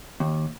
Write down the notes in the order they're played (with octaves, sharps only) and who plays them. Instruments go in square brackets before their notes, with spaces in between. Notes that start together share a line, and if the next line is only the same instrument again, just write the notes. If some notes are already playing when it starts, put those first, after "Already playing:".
[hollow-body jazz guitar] D#2